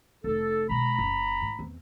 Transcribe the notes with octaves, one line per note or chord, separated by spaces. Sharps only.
F1 D#4 A4
B2 G#3 A#5 B5
F#1 F#2
G#2
E2 C4